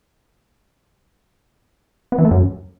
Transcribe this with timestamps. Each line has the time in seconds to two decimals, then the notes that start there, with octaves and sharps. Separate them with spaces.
2.12 B3
2.18 E3
2.25 A3
2.31 F#2